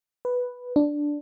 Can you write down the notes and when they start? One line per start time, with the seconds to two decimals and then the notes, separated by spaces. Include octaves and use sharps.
0.25 B4
0.76 D4